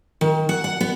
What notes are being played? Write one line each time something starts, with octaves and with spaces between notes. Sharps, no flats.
D#3
F#5
F#5
B3